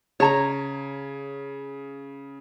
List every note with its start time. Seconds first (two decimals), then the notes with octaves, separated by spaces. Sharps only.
0.20 C#3 C#5 A5 A#5